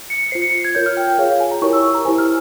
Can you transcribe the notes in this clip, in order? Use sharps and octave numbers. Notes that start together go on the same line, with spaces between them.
C#7
F4 C5 C7
C#7
G#6
F4 A#4 C#5 G6
F6
G5
G5
F4 G#4 C#5 F5
F5
G#5
A#5
E4 G4 A#4 C#5 C#6
E6
E6
A#5
E4 G4 C5 G#5
F6